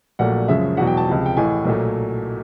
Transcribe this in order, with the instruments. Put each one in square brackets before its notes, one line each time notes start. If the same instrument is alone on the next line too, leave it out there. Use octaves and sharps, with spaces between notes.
[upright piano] A#1 A#2 F#3 A3 F#5
F#2 C#3 F3 G#3 E5
E2 B2 F#3 F#5
G5
A5
C#2 C3 F3
G5
A1 A2 E3 G#5
B1 A#2 F#3 A3